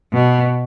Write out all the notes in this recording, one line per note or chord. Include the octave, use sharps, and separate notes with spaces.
B2